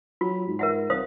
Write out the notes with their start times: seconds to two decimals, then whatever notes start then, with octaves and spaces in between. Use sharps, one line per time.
0.21 F#3 F4
0.47 G#2
0.59 A#4 E5 F#5
0.90 C2 C5 F5 D#6